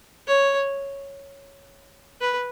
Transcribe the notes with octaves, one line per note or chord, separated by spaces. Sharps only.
C#5
B4